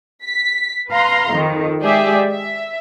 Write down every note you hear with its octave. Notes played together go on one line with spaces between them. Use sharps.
B6
B4 F5 A#5 C6
F2 D#3
G#3 G4 G#4 D5 E5
E5